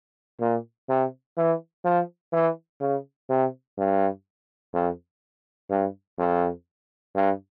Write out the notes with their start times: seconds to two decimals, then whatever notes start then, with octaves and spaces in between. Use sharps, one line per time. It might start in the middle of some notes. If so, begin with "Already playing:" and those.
0.41 A#2
0.89 C3
1.37 E3
1.85 F3
2.33 E3
2.81 C#3
3.30 C3
3.78 G2
4.74 F2
5.70 G2
6.19 F2
7.15 G2